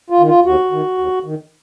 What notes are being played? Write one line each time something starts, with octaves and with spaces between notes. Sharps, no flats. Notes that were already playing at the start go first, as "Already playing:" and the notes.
F4
D#3
F4
D#2 F#4
D#3
D#2
D#3